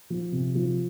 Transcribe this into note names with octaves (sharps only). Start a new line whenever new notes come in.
F3
C3
F3